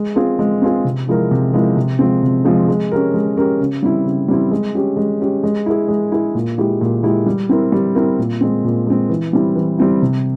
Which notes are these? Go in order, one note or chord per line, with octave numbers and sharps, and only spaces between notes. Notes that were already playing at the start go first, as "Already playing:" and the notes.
Already playing: G#3
C4 F4 G#4
G#3
C4 F4 G#4
C3
F3 G#3 E4 A#4
C3
F3 G#3 E4 A#4
C3
F3 G#3 C4
C3
F3 G#3 C4
G#3
C#4 G4 A#4
G#3
C#4 G4 A#4
C#3
G3 C4 E4
C#3
G3 C4 E4
G#3
C#4 G4
G#3
C#4 G4
G#3
E4 G#4
G#3
E4 G#4
A#2
G#3 E4 G4
A#2
G#3 E4 G4
G3
C4 E4 A#4
G3
C4 E4 A#4
A#2
G#3 C4
A#2
G#3 C4
E3
G3 C4 E4
E3
G3 C4 E4
C3